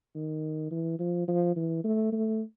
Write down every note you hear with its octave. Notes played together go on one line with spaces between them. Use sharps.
D#3
E3
F3
F3
E3
A3
A3